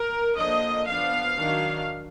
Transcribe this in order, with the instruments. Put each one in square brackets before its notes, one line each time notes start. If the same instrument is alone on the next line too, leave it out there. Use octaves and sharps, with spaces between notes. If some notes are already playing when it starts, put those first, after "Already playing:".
Already playing: [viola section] A#4
D3 F3 A#3 D4 D#5
F3 B3 D4 F5
D#3 F#3 D4